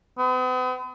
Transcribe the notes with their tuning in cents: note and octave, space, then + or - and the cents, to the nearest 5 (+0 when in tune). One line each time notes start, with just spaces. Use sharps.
B3 +45